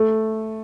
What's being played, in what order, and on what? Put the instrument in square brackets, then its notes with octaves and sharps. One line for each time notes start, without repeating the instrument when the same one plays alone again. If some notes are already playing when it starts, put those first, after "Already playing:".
Already playing: [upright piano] A3